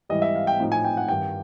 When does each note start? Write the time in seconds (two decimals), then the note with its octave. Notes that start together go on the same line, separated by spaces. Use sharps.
0.09 G#2 E3 G3 D#5
0.22 E5
0.35 F5
0.47 G5
0.60 A2 F3 A3 C4 D#4
0.72 G#5
0.85 G5
0.97 F#5
1.08 G2 D#3 G3 G5